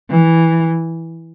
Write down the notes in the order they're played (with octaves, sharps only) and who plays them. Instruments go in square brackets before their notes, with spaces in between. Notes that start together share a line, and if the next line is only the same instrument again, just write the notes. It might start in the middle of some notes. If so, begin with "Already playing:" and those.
[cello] E3